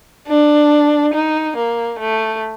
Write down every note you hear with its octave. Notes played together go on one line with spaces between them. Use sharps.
D4
D#4
A#3
A3